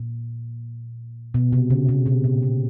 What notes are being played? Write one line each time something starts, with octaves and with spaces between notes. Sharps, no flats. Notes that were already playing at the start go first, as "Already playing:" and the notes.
Already playing: A#2
B2
C3
C#3
C3
B2
A#2
B2